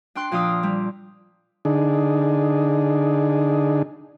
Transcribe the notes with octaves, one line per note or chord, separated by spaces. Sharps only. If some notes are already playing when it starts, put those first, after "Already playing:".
D4 G5 C6 F#6
A#2 F3 D4 F5 D#6 E6
G3
D3 D4 D#4 G#4